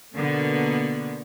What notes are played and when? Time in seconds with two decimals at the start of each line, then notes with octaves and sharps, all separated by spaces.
0.14 B2 D3 A#3 B3